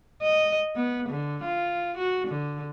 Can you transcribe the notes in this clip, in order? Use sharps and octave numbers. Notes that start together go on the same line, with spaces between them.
D#5
B3
D3
F4
F#4
D3